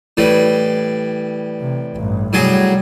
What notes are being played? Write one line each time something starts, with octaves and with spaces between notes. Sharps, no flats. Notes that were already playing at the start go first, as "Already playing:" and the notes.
A2 E3 G3
C3
A1 G2
A2 C3 F#3 G3 G#4